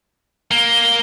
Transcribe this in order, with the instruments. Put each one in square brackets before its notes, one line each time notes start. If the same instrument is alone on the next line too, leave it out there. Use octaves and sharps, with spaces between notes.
[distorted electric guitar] A#3 [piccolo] G7